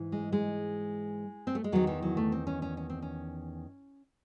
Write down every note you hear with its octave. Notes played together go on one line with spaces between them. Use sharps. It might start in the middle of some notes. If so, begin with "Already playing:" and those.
Already playing: G#2 E3
G#3
G#3
C4
A3
G#3
E2 D#3 F#3
E3
F#3
A3
C4
C#4
C#4
C#4
C4
C#4